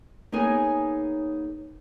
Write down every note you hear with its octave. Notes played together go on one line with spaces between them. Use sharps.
A#3 B3 D#4 G#4 C#5 G#5